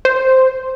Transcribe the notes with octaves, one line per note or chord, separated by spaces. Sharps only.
C5